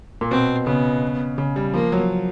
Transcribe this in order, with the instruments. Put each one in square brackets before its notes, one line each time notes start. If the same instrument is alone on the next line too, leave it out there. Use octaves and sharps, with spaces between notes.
[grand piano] A#2
[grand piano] B2 [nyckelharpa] C4
[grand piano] C#3 [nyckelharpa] B3
[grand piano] C#3
G3
[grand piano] F3 [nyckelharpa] A#3
[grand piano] F#3